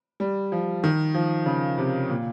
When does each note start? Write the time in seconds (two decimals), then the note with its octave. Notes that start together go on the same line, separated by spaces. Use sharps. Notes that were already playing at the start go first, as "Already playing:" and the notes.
0.20 G3
0.52 F3
0.84 D#3
1.14 F3
1.46 C#3
1.78 C3
2.09 A#2